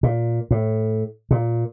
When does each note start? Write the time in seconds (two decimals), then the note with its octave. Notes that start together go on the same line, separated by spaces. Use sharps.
0.03 A#2
0.51 A2
1.31 A#2